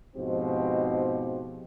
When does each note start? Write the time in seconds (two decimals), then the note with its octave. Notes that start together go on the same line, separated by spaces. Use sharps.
0.16 G#2 B2 F3 C4 G4